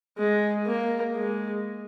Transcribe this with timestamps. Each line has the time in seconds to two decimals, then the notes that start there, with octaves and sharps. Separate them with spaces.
0.18 G#3
0.67 A#3
1.16 G#3